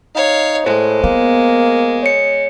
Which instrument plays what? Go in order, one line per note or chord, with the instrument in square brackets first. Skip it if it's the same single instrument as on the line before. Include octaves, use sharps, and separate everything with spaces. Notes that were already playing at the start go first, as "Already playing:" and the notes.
[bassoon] D#4 [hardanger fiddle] C#5 F5
[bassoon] A2 [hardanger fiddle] G#3 [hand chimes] C5
[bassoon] A#3 [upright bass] B3
[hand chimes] C#5 C#7